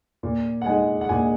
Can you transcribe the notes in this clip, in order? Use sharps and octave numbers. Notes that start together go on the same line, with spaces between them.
A#2
F#5
G#3 D#4 G#5
F#5
A#2 G#5